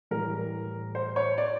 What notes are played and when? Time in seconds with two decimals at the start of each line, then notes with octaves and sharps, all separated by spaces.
0.11 A2 E3 G3 A#4
0.95 C5
1.16 C#5
1.38 D5